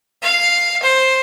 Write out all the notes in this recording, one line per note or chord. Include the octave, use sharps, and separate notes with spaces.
F5
C5